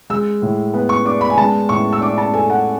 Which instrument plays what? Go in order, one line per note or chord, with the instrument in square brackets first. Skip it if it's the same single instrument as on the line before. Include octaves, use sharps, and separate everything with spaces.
[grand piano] G#3 [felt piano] E6
[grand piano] A2
B3
[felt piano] C#6
[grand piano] D4 [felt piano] D6
[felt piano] B5
G#5
[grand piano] G#3 [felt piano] A5
[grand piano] A2 [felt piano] C#6
[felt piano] E6
[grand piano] D4 [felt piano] D6
[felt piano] A5
[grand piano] A4 [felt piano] G#5
[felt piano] F#5